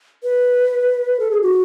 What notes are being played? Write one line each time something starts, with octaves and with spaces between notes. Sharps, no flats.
B4
A4
G#4
F#4